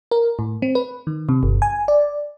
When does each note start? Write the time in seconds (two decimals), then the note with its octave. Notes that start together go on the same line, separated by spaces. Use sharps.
0.11 A#4
0.39 A2
0.62 C4
0.75 B4
1.07 D#3
1.29 C3
1.43 G1
1.62 G#5
1.88 D5